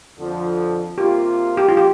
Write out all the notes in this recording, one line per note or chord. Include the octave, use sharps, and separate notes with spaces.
F2 D3 F3
C3 A#3 F4 G4
G4
F4
G4